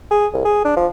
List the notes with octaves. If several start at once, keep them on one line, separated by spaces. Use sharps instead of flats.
G#4
C2
G#4
D4
F3